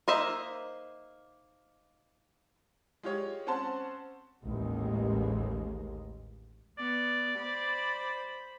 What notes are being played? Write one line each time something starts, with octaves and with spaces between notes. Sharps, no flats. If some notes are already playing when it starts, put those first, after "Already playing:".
A#3 D#4 C5 D#5 E5
G#3 F4 G4 C#5
C4 C#4 C5 F#5 A5 C6
A1 D#2 G#3 A#3
B3 D5
C5 B5